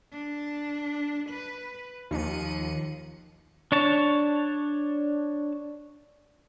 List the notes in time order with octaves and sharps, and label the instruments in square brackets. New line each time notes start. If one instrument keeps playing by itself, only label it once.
[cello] D4
B4
[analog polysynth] D#2 C#7 D#7 [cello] F3
[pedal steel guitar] D4 C#5 A5